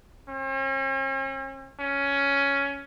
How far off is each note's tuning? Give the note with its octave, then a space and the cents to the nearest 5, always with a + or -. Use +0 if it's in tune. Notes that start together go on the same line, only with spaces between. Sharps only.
C#4 -45
C#4 +10